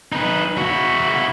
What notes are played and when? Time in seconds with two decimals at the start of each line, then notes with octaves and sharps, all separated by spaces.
0.13 D#4 B4
0.58 E4 F#4